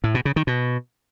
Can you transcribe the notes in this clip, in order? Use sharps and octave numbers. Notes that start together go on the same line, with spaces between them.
A2
B2
C#3
D#3
B2